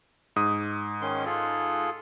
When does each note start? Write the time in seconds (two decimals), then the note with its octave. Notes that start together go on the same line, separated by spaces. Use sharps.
0.36 G#2 D#6
1.02 D#3 C#4 C6
1.25 F4 G#4 A4